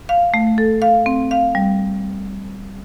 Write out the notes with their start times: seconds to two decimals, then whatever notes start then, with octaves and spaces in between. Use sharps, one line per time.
0.09 F5
0.34 A3
0.58 A4
0.82 F5
1.06 C4
1.31 F5
1.55 G3